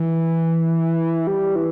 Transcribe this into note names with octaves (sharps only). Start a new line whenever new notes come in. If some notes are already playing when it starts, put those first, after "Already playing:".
Already playing: E3
G3
E3